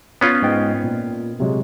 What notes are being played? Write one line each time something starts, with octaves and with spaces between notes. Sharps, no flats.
B3 C#4 F4
G#2 D#5 G5
A#2
C3 F#3 G#3